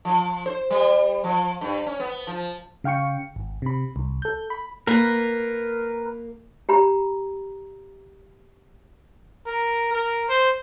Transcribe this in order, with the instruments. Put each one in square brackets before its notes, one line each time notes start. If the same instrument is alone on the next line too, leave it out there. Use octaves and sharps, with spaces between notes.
[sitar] F3
C5
G3
F3
G2
C#4
B3
F3
[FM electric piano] C#3 F5 G5 C#6 C#7
G#1
C3 B5
C2
A4 G6
B5
[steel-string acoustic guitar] A#3 [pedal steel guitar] A#4 B4
[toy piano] G4 A#5 B5
[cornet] A#4
A#4
C5